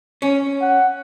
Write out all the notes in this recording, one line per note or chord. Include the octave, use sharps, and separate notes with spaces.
C#4
F#5